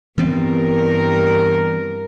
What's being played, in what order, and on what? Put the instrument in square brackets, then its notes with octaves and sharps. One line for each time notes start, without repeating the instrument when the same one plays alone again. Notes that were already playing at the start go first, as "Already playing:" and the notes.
[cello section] G2 A#4 [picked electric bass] E3 B3 C4